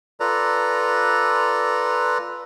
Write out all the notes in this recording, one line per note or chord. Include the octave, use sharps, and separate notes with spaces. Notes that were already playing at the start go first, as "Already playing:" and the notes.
F4 A4 B4 D5 A#5